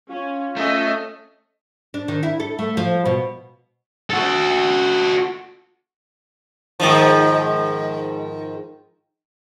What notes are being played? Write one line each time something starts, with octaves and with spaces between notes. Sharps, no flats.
C#4 F4
A3 C#4 D#5
D4
D#3
E4
A4
A3
F3
B2
F#4 A4
G#2 D#3 F3